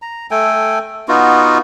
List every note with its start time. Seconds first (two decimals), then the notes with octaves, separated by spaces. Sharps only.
0.02 A#5
0.31 A3 A4 G5 G#5
1.08 B3 D#4 F4 F#4